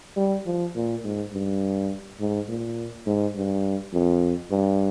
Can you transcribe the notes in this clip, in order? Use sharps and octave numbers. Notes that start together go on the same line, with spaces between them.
G3
F3
A#2
G#2
G2
G#2
A#2
G#2
G2
F2
G2